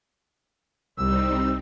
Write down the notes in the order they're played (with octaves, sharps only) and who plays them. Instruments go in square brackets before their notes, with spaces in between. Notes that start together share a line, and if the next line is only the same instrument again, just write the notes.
[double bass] C2 [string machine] G3 C4 D#4 [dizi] E6